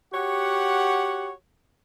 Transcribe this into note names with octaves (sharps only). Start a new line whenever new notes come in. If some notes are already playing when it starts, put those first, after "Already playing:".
F#4 G4 C#5 F#5